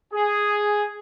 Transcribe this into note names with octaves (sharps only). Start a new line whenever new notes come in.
G#4